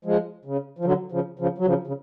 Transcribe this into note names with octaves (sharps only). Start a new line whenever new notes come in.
F3 G#3
C#3
F3
D3 F#3
C#3 F3
C#3 F3
F#3
C#3 F3
C#3